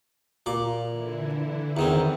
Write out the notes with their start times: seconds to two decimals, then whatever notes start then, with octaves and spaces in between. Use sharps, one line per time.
0.46 A#2 D6
0.88 D3 E3 E4
1.77 E2 D#3 C4